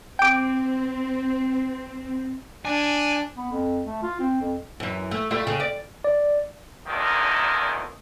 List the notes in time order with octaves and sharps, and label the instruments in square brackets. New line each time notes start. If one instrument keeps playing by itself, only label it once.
[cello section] C4 [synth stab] G5 D6
[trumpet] D4 [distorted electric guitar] G#5
[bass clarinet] B3
F2
A3
F4
C4
F2
[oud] F#2 E3
A3
G3 A3 F4
C#3
D5
[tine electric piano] D5
[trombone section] G#1 E2 A#2 D3 D#3